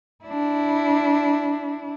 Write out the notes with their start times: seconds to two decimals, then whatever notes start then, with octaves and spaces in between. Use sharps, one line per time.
0.24 D4 E4